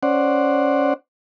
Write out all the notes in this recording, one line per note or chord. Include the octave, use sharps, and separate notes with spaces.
C#4 C5 D5 F#5